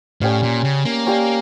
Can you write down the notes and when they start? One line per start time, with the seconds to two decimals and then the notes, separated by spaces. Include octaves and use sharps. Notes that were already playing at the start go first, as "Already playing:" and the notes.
0.21 A2 C#4 G4 D5 F5
0.43 A#2
0.64 C#3
0.85 A#3
1.06 C#4 G4 D5 F5